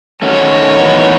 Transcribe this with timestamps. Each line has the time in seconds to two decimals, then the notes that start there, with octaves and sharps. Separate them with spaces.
0.22 D#3 A3 C#4 F#4 C#5
0.78 A2 E3 B3 D#4